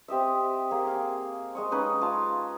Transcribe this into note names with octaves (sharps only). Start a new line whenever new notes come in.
C4 G4 D#5 E5
A#3 G#4
F5 G5 G#5
G#3 D#5 C#6
C#4 D#4 B4 D#6
F4 A5